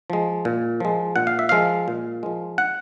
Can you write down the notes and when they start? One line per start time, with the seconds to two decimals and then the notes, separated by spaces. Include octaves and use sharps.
0.10 F3 G#3
0.45 A#2
0.80 F3 G#3
1.16 A#2 F#5
1.27 F5
1.39 E5
1.49 F3 G#3 F5
1.88 A#2
2.23 F3 G#3
2.58 F#5